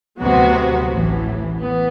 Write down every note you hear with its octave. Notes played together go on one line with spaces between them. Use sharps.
D2 C3 F#3 B3 F#4
A1 A2 E3
E3 B3